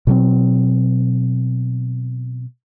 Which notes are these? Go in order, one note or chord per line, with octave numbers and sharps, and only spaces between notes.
B2 F#3 C4